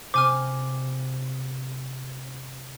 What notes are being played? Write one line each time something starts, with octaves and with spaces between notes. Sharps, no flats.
C3 G4 C5 G#5 D6 F6